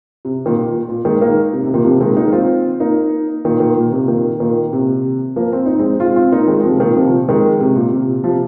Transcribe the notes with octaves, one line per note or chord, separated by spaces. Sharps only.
C3
A#2 D#3
A#2
A#2
D#3 G#3
A#3 D#4
C3
C3
A#2 D#3
C3 F3
D#3 G#3
A#3 D#4
C4 F4
A#3 D#4
A#2 D#3
A#2 D#3
A#2
C3
A#2 D#3
A#2 D#3
C3
F3 A#3
C4
D#4
G#3 C4
C4 F4
C4 F4
A#3 D#4
D#3 G#3
C3 F3
A#2 D#3
C3 F3
D#3 G#3
C3
A#2
C3
C3 F3